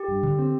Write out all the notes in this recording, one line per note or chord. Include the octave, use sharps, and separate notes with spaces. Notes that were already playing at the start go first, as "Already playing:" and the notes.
Already playing: G4
G2
D3
C4